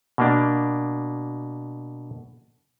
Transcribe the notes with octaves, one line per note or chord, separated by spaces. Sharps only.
B2 A#3 D4